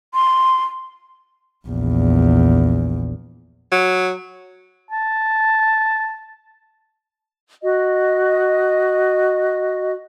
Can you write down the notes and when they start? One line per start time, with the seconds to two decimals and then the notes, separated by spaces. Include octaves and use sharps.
0.14 C6
1.67 A#1 E2
3.72 F#3
4.91 A5
7.63 F#4 D#5